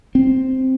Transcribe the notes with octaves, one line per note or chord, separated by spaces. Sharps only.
C4